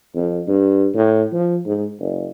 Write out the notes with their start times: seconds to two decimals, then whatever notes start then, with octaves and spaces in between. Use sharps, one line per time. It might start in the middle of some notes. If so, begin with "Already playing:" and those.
0.15 F2
0.47 G2
0.94 A2
1.32 F3
1.65 G#2
1.99 F#1